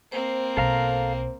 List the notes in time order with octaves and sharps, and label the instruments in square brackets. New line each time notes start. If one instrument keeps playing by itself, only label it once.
[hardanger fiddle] A#3 C4 [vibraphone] C5
[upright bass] B1 [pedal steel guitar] A4 F5 A#5